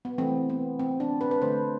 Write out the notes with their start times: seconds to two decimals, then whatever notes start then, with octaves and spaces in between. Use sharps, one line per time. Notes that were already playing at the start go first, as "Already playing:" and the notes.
0.05 B3
0.18 E3 A3 C4
0.50 B3
0.79 C4
1.00 D4
1.21 B4
1.31 B4
1.42 D3 A3 C5